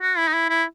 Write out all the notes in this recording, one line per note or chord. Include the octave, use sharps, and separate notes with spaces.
F#4
E4
D#4
E4
E4